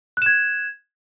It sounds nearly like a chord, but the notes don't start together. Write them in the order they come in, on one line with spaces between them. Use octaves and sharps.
F#6 E7 G#6